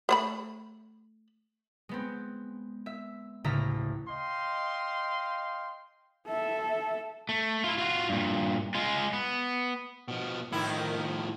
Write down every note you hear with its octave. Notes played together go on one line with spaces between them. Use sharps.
A3 C5 B5
G#3 B3 C4
E5
A1 D2 C#3 E5 A#5
D#5 F5 G5 C6
A4 E5
A3
E4 F4
F4 F#4
G2 A#2
G#3 F4
B3
B2 F3
A2 D#3 F3 E4